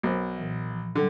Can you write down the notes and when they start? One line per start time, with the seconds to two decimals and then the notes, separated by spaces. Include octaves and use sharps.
0.03 B1 A#4 C5
0.38 A#2 E3
0.70 F3
0.96 D3 F#3 G3